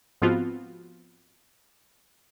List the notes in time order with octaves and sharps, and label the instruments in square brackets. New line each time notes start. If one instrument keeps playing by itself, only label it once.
[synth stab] G#2 F3 B3 C4 F4 F#4